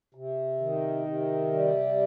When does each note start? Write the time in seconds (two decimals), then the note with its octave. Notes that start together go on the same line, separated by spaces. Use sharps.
0.14 C3
0.60 D#3
1.07 C3
1.53 G3